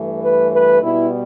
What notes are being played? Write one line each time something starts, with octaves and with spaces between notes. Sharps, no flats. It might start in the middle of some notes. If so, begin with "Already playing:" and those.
Already playing: G2 E3 A3
B4
B4
B2 G3 B3 E4